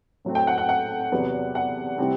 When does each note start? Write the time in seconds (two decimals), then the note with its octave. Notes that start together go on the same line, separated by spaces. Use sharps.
0.25 A2 F#3 A3 C4
0.35 G5
0.47 F#5
0.58 F#5
0.69 F#5
1.12 E2 C3 F#3 B3
1.55 F#5
1.98 C3 G3 C4 E4